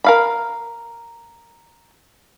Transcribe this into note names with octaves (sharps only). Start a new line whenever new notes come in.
A#4 F5 B5